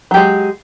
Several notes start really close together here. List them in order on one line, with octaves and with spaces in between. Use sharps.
F#3 G4 G#3